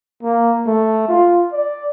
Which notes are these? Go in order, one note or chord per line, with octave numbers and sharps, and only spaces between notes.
A#3
A3
F4
D5